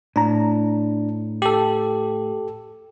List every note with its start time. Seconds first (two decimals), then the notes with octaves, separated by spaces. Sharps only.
0.16 A2 D4 A#5
1.42 G4 A4